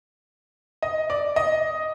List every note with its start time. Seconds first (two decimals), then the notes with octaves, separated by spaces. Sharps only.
0.82 D#5
1.10 D5
1.36 D#5